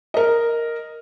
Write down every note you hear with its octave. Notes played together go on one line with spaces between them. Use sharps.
A#4 D#5